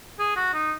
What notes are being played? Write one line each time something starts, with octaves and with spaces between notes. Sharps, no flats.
G#4
F#4
D#4